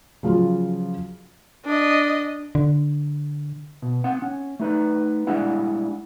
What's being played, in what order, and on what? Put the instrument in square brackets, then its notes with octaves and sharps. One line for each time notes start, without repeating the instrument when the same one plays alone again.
[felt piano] C#3 F3 F#3 F4
[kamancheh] D4 D#5
[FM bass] D3
[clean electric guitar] B2
C4 F#5
C#4
A3 D#4 B4
G3 G#3 D4 E4 F#5